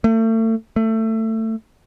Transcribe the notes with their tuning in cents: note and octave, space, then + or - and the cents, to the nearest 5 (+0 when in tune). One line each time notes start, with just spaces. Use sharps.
A3 +35
A3 +20